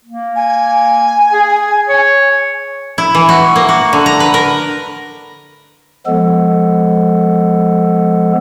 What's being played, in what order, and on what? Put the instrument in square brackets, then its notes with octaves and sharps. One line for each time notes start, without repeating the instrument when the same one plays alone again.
[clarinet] A#3
[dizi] G#5
[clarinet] G#4
C#5
[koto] E4
E3
F#4
A#3
F#4
D3
A#5
B4
A#4
[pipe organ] F3 G#3 B3 A4